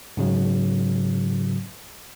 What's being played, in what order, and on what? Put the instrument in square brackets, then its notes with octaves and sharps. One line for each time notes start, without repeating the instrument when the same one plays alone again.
[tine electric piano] G#2 C#3 F#3